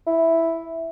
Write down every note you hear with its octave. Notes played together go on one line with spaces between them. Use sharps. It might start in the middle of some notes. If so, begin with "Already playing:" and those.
E4